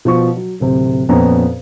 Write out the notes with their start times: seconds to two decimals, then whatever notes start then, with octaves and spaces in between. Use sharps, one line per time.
0.05 B2 F3 C#6
0.36 F#3
0.60 D1 C3
1.09 F2 A#2 B3 C#4 A#5